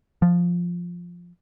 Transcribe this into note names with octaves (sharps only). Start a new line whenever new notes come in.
F3